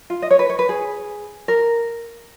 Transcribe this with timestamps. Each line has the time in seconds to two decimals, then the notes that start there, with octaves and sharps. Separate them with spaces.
0.10 F4
0.22 D#5
0.31 C#5
0.39 B4
0.49 C#5
0.59 B4
0.69 G#4
1.48 A#4